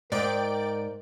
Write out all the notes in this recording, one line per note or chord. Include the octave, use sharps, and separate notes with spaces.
G#2 A#4 D5 G5 D7